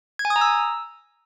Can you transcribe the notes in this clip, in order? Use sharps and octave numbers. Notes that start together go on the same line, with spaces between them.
G#6
G#5
D#6
A#5
E6